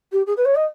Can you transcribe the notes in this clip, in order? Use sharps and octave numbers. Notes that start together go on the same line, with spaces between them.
G4
G#4
B4
C#5
D#5